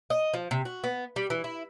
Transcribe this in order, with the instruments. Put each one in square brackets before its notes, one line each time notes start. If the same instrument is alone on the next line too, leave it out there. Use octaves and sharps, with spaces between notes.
[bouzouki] D#5
F3
C3
F#4
B3
G3
E3
E4